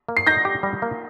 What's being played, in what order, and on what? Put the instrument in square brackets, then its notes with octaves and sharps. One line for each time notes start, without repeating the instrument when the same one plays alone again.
[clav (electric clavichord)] A#3
[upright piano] C7
[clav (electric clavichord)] D#4 [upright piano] G6 A#6
[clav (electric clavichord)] G4
G3
A#3